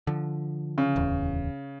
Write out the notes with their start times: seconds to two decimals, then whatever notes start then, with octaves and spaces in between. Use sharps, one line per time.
0.07 D3 F3
0.78 C#3
0.96 D1 E2